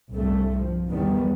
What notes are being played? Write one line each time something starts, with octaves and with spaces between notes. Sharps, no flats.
C2 G2 A3
F3
E2 D#3 G3 B3